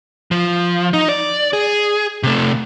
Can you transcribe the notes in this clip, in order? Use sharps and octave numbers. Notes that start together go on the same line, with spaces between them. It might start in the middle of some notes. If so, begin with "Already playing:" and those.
F3
D#4
D5
G#4
C3 A3